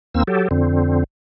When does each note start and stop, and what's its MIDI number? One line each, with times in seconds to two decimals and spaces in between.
0.14 0.23 39
0.14 0.23 58
0.14 0.23 60
0.14 0.23 88
0.27 0.48 54
0.27 0.48 67
0.27 0.48 69
0.51 1.04 41
0.51 1.04 50
0.51 1.04 60